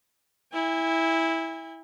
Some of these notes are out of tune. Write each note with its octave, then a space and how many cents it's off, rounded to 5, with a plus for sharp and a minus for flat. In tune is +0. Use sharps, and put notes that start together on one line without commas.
E4 -10 G#5 -40